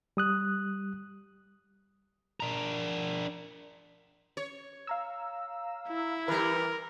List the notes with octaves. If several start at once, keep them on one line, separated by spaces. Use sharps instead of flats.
G3 D#6 F#6
D4 A#4
C#5
F5 A#5 E6
E4
E3 G3 A#4 B4 B5